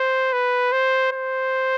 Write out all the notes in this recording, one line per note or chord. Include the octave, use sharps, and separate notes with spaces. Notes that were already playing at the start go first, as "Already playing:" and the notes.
Already playing: C5
B4
C5
C5